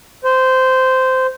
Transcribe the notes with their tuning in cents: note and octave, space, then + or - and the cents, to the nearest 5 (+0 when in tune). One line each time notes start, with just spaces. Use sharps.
C5 -15